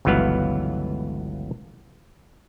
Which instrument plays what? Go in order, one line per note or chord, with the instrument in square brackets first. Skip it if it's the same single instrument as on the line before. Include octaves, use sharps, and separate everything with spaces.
[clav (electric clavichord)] G1 C#2 E3 F#3 B3 F5